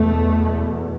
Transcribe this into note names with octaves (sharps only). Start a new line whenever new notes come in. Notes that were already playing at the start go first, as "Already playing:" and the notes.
Already playing: E2 B2 A3